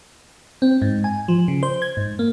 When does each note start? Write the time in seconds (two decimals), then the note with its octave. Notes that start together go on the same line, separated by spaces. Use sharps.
0.62 C4
0.82 G#2
1.04 G#5
1.28 F3
1.48 C#3
1.63 C5
1.82 G#6
1.97 G#2
2.19 A#3